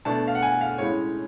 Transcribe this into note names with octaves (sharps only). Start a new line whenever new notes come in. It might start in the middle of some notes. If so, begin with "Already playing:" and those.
B2 A3 D4 A5
F5
F#5
G#5
F5
A2 G#3 C#4 C#5